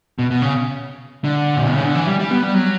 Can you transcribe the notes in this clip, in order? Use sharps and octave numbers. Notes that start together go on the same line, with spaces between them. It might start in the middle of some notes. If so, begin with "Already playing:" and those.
B2
B2
C#3
D3
A#2
B2
C#3
D3
E3
G3
G3
B3
G3
F#3